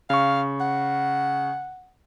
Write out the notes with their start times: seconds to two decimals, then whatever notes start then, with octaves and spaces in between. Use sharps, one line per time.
0.10 C#3 F5 C#6
0.60 F#5